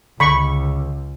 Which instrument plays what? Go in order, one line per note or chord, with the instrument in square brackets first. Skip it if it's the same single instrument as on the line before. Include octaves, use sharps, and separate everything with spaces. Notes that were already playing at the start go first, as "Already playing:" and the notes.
[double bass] C#2 [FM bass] D3 [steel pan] B5 C#6